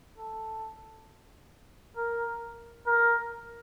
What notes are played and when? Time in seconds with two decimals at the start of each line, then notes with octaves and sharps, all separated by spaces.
0.18 A4
1.97 A#4
2.87 A#4